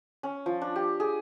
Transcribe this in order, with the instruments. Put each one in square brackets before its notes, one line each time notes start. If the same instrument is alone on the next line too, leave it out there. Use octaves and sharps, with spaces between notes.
[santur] C#4
F3
D4
G4
G#4